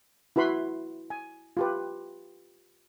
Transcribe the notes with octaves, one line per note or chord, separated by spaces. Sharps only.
E4 F#4 B4 B5 C6
G#5
F4 G4 B4